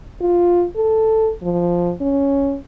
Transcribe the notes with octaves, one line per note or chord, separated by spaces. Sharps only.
F4
A4
F3
C#4